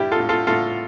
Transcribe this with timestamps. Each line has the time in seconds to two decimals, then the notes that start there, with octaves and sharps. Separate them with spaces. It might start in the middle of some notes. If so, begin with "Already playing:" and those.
Already playing: G2 G3 E4 G4
0.12 F4 A4
0.20 A2
0.29 F4 A4
0.47 A2 F4 A4